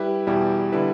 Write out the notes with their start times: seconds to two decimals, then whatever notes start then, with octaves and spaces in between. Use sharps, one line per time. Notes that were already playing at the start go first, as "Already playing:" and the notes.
Already playing: G3 E4 G4 B4
0.27 E2 B2 G3 E4 G4
0.72 D3 G3 E4 B4